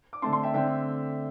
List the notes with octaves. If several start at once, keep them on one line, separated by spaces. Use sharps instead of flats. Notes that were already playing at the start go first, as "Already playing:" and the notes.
D6
D3 A3 C4 A5 C6
A5 C6
E5 G5
D3 A3 C4 E5 G5